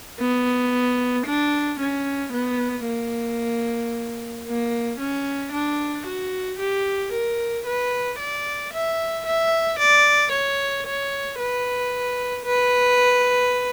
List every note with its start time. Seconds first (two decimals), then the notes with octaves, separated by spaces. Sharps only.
0.20 B3
1.26 D4
1.80 C#4
2.33 B3
2.87 A#3
4.47 A#3
4.99 C#4
5.53 D4
6.06 F#4
6.59 G4
7.13 A#4
7.66 B4
8.19 D5
8.73 E5
9.26 E5
9.79 D5
10.32 C#5
10.87 C#5
11.39 B4
12.46 B4